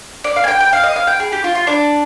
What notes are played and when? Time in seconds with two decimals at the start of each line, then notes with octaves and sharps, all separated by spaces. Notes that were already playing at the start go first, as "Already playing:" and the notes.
0.24 D5
0.36 F5
0.44 G#5
0.48 G5
0.60 G5
0.73 F5
0.84 D#5
0.96 F5
1.07 G5
1.20 G#4
1.32 G4
1.44 F4
1.55 F4
1.67 D4